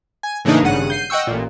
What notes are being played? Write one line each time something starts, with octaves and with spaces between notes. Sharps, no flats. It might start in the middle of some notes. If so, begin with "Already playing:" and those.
G#5
A2 C#3 E3 A#3 D4 D#4
G#1 G2 C#3 F#5 D#7
G6 C7 D#7
D#5 F#5 G5 C#6 E6
A1 A#2